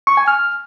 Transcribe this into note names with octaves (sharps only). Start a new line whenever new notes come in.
C#6
G#5
F6